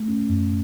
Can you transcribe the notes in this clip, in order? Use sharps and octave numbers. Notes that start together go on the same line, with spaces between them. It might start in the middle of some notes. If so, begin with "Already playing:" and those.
Already playing: A3
C#4
F#2